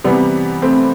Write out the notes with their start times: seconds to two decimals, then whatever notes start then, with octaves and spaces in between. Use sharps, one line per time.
0.04 C3 E3 G3 B3
0.62 A3 C4